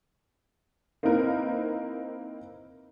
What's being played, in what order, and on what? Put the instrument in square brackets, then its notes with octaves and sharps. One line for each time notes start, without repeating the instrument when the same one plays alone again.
[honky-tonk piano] A#3 C4 D#4 E4 A#4 B4